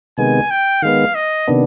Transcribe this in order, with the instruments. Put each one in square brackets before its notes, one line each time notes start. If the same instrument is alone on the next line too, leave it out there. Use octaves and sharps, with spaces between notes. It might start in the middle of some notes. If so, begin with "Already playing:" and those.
[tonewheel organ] C3 D#3 G#3 B3 [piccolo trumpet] G#5
[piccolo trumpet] G5
[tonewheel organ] D#3 G#3 B3 [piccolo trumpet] F5
[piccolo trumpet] D#5
[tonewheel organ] C3 D#3 B3 D4